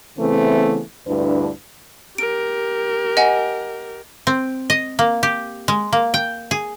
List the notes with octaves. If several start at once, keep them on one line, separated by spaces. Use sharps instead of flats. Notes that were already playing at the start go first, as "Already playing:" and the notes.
C#3 E3 A3 B3 C4
D2 G2 D4 E4 B4
G4 A#4 D7
D#5 F#5 G#5
C4
D#5
A#3
G4
G#3
A#3
G5
G#4